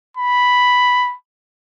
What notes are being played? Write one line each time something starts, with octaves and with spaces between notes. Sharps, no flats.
B5